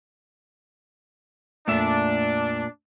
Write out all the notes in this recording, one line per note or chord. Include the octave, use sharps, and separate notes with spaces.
F2 A#2 A3 D4 E5